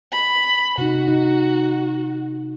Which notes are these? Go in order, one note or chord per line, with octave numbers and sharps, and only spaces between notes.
B5
C3 D#4 F#4
D#4